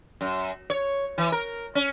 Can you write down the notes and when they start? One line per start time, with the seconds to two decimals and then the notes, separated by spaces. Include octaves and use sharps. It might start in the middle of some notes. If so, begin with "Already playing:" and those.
0.21 F#2
0.70 C#5
1.18 E3
1.32 A#4
1.75 C#4